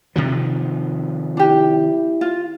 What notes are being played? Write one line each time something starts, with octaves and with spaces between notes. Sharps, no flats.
C3 D#3 F3
D4 E4 G4
F4